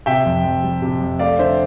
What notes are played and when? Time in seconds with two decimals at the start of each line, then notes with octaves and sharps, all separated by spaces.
0.06 C3 E5 G5
0.25 F2
0.44 F2
0.63 G3
0.82 C3
1.01 F2
1.19 A3 D5 F5
1.39 D3 C5 E5